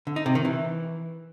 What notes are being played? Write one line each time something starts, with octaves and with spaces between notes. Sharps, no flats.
D3
D#4
C3
D#3
E3